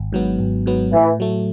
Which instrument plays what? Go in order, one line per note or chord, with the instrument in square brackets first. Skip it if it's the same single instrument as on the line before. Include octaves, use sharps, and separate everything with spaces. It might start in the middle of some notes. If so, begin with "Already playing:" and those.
Already playing: [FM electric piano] G#1
G#2 F#3 B3
G#1
G#2 F#3 B3
[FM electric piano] A2 [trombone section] E3
[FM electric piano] F#3 A3